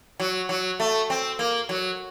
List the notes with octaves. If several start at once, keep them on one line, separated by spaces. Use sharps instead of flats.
F#3
F#3
A3
C4
A#3
F#3